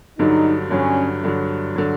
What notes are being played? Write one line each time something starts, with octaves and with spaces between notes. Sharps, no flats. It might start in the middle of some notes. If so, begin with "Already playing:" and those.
G2 D3 F#3 D#4
G2 D3 F#3 C#4
G2 D3 F#3
D3 F#3